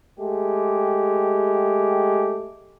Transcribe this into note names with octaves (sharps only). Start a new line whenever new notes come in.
G#3 A3 G4